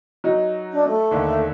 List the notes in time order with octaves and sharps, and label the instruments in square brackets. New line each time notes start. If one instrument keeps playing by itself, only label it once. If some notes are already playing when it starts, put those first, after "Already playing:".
[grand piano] F#3 D#4
[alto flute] D4
A3
[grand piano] D#2 D3